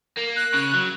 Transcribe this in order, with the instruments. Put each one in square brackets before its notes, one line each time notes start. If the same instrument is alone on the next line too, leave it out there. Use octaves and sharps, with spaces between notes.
[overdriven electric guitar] A#3
[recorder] F#6
[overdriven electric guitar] C#3
F#3